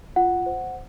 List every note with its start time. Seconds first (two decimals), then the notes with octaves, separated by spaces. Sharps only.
0.16 F4 F#5
0.46 C5